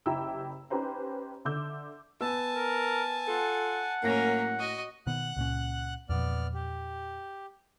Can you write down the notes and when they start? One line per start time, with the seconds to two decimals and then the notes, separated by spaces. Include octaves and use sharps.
0.06 F#1 E4 G4 G5 A#5 E6
0.70 C#4 D#4 G4 B4 C5 A#5
1.45 D3 E5 D6 E6 G6
2.21 B3 G#5 A5 E6
2.55 A#4
3.27 F4 A4 F#5
4.03 A2 F#3 A#3 C#4 A#4 A#6
4.59 F#4 D#5
5.07 B2 D#3 B3 F#5 F#6
5.36 C#2 A#2 C#4
6.09 E2 A#2 F3 B3 D5 F6
6.54 G4